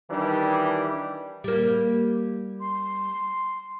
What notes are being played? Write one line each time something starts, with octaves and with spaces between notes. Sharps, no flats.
D#3 E3 G3 D4
G3 A#3
C6